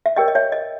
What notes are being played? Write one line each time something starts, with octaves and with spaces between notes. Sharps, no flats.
E5
G4 A#4 C#5 D#5 G5
D#5
C#5 E5
D#5